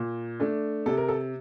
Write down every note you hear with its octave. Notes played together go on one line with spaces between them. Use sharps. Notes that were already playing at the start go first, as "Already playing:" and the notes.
Already playing: A#2
A3 D4
C3 A4
A#4
A4